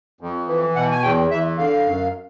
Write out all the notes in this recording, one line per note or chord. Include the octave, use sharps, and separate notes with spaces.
F2
E3
B2 F#5
G#5
E2 G5
E2 E5
D3 F5
F#2